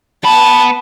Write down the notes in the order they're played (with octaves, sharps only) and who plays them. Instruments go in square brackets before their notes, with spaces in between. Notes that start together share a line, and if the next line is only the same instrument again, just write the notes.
[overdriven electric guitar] B3 B5 [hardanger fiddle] A5